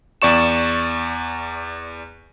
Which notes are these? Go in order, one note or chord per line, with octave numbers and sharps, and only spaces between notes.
E2 D5 C#6 E7